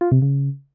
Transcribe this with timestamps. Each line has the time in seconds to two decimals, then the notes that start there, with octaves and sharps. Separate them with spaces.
0.01 F4
0.11 C3
0.22 C#3